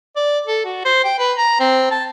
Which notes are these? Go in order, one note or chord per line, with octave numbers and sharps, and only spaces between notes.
D5
A4
F#4
C5
G5
B4
A#5
C4
A5